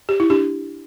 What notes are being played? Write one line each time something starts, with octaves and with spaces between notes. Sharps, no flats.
G4
E4
D4 G4